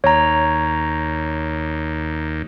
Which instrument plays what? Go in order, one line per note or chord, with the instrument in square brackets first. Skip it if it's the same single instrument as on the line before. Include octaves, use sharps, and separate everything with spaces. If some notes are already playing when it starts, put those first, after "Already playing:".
[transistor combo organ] D#2 [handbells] C#5 A#5